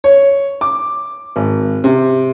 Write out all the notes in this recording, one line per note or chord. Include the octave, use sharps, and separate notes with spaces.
C#5
D6
G#1
C3